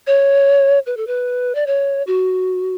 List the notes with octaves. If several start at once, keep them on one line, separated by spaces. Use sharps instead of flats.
C#5
B4
A4
B4
D5
C#5
F#4